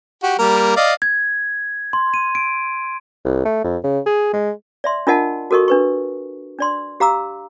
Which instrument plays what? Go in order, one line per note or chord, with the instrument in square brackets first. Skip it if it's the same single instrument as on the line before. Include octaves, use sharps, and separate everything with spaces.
[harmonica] F#4 G4
G3 A#3 A#4
D5 D#5 F5
[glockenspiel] G#6
C6
D#7
D7
[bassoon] C2
A3
F2
C#3
G#4
G#3
[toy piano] D5 E5 C6
D4 F4 A#4 D#5 F#5 A5
F#4 A4 A#4 D#5 C#6
D4 B4 C#6
D4 D5 C6
G4 F5 A#5 D6 E6